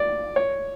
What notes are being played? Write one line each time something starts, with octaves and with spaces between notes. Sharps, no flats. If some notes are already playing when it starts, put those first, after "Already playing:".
Already playing: D5
C#5